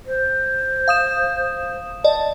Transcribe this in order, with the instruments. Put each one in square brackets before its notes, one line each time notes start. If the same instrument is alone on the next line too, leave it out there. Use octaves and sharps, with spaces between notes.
[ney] C5
[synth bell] F5 D#6 E7
[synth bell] D5 D#5 [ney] A5